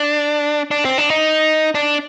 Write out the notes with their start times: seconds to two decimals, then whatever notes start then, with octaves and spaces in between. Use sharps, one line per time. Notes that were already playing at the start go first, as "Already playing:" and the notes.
Already playing: D4
0.71 D4
0.85 C4
0.98 D4
1.10 D#4
1.75 D4